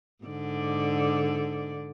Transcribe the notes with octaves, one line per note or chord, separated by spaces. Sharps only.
G#2 D3 D5